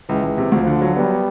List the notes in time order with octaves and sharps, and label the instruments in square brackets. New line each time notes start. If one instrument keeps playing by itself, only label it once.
[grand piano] C#2 [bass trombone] E3
[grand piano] C#2
C3
[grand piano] D2 [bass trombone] F3
[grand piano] D3
F#3
[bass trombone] G3 [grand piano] B3